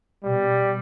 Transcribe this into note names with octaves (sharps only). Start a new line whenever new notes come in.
B2 G3